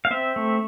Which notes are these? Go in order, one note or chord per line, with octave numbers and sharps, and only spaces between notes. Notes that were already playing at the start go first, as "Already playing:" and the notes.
F5
C4 E5
A3